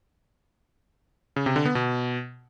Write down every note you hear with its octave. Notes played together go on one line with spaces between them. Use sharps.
C#3
C3
D3
B3
B2